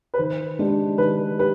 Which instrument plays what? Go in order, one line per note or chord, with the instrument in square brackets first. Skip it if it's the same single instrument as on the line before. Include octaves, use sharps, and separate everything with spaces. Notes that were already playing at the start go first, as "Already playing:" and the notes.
[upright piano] B4
[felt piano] D#3 [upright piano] C5
[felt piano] G#3 D4 G4
[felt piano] D#3 [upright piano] B4
[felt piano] G4 [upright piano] B4